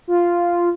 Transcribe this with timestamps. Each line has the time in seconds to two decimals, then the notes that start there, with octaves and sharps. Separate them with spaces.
0.08 F4